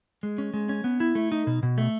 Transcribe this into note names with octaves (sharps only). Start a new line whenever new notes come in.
G#3
C#4
G#3
C#4
B3
E4
A3
D#4
B2
B2
A3